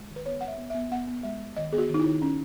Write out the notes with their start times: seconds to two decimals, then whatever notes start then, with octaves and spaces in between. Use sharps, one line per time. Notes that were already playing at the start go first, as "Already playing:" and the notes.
Already playing: G#3
0.10 D#3
0.16 B4
0.26 B3 C#5
0.41 G#3 F#5
0.48 E5
0.58 B3
0.70 B3 E5
0.91 B3 F#5
1.08 B3
1.23 G#3 E5
1.40 G#3
1.57 D#3 D#5
1.72 B3 G#4
1.78 F#4
1.89 D#3 D#4
2.00 E4
2.05 D#3
2.22 C#4